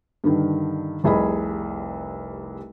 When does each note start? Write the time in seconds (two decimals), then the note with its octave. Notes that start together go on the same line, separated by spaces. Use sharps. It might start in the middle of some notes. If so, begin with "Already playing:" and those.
0.24 G2 D3 D#3
1.04 F1 C2 G#4 D#5 B5